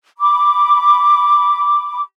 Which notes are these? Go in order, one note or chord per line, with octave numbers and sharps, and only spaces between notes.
B5 D6